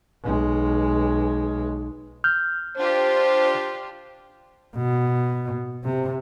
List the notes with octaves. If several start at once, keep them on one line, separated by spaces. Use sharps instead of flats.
B1 G#3
F6 G6
D4 F4 G4 C5
B2
C3